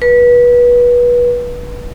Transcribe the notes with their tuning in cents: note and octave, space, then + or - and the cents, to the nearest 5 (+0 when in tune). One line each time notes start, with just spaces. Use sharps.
B4 -25